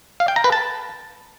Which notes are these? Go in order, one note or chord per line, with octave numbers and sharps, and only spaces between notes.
F5
G5
A#5
B4
A5